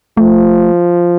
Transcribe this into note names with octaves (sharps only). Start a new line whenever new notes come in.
F3 A3